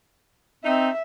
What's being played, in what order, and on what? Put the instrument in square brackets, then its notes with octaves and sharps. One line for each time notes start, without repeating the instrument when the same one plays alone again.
[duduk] C4 [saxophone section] D#4 [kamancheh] E5